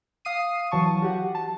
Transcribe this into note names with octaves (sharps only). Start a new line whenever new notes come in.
F5 D#6 C7 D#7
E3 F#3 A5 C#6
F#4 G4 F#5
A5